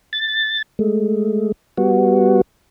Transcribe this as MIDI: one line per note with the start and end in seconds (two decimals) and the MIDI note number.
0.13 0.62 93
0.79 1.52 56
0.79 1.52 57
1.77 2.41 55
1.77 2.41 59
1.77 2.41 66